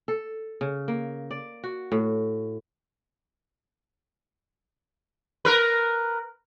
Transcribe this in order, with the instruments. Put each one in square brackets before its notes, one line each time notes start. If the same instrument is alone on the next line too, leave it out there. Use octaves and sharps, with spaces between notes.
[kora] A4
C#3
A#3
D5
F#4
A2
[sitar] A#4 B4